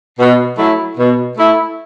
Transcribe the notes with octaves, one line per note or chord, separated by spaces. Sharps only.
B2
F#3 A3 E4
B2
A3 E4